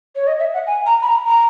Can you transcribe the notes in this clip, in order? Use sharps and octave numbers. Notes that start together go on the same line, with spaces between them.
C#5
D#5
E5
F#5
G#5
A#5
B5
A#5
A#5